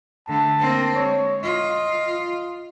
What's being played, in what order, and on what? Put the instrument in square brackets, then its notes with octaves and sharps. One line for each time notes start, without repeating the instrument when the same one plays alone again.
[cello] D3 A3 [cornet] A5
[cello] A#3 C4
[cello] G#3 [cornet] C#5
[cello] F4 [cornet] D#5